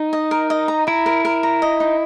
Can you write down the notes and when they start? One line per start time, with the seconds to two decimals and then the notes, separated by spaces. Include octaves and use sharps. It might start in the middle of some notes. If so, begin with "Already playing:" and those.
Already playing: D#4
0.13 D#5
0.31 A#4
0.50 D#5
0.68 A#5
0.87 E4 A#5
1.06 A#4
1.25 A#4
1.43 A#5
1.62 D#5
1.80 D#4